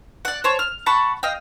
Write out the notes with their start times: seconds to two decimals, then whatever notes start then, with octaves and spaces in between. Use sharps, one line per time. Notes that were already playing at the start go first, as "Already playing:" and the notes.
0.25 D5 F#5
0.44 C5 C#5 A5
0.59 F6
0.86 F#5 A5 B5 C#6
1.23 D#5 F5 G5